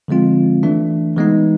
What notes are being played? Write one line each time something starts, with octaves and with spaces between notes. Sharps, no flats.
D3 F3 G#3 C4 F4
E3 A3 D4
E3 G#3 B3 D#4